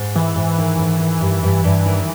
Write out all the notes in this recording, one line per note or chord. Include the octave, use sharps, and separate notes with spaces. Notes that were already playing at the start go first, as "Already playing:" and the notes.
Already playing: G#2
E3 G#3
G#2
D#3
G#2
D#3
G2
G2
G2
D#3